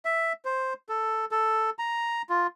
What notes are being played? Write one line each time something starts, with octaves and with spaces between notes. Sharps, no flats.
E5
C5
A4
A4
A#5
F4